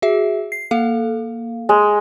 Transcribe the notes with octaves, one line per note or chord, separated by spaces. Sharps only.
F#4 G#4 E5
C7
A#3 A4 F5
G#3